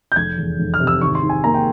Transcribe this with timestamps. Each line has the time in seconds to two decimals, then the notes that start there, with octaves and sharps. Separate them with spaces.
0.12 G6
0.16 F1 G#6
0.37 E2
0.59 F1
0.74 F6
0.80 C3
0.87 E6
1.01 G#1 C#6
1.15 C6
1.23 G#2
1.29 G#5
1.44 A#3 A#5
1.54 G5